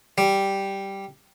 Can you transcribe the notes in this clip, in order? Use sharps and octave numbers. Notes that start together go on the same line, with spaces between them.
G3